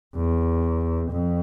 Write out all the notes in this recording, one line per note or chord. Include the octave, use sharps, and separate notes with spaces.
E2
F2